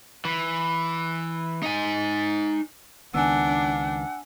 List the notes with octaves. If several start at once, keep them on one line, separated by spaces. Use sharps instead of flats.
E3
D#4 G#5
C#2 D#3 B3 D4 F#5 G#5 E6